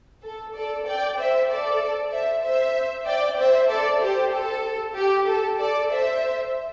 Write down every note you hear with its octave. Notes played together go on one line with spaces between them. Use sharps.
A4
A4 D5
D5 G5
C5 E5
A4 D5
C5 E5
C5 E5
D5 G5
C5 E5
A4 D5
G4 C5
A4
G4
A4
A4 D5
C5 E5